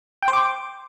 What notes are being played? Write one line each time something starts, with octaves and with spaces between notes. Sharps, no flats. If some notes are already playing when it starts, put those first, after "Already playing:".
G5
C5
D6